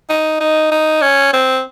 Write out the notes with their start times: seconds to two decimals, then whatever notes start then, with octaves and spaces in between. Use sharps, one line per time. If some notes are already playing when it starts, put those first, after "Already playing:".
0.10 D#4
0.40 D#4
0.71 D#4
1.02 C#4
1.33 C4